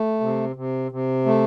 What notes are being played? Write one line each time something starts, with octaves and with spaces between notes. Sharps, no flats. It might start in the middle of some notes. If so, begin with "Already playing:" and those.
Already playing: A3
C3
C3
C3
A3